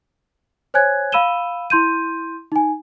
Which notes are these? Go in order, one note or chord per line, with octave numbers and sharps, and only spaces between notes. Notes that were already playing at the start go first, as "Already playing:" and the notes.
C5 C#5 G#5 F#6 G#6
F5 B5 E6 D#7 E7 G7
E4 C6 G6 D#7
D#4 G#5